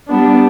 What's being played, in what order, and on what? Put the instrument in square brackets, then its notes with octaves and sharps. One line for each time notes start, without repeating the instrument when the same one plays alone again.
[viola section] G3 B3 D4